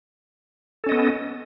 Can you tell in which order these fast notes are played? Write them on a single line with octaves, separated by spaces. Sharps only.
A4 C#4 D#5 B3